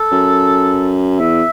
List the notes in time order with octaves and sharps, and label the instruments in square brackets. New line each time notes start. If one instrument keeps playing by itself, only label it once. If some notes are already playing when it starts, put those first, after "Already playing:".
Already playing: [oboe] A4
[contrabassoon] F#2
[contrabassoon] E2 [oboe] E5